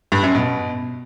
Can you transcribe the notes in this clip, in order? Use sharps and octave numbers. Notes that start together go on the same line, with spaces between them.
G2
F#2
B2